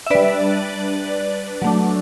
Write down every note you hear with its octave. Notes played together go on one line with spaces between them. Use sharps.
E5
G3 D4 B4 D5
F#3 A3 D4